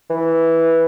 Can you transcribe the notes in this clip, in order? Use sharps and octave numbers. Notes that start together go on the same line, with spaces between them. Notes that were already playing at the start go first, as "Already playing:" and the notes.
E3